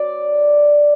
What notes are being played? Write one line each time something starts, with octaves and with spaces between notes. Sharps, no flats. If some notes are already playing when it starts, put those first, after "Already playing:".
Already playing: D5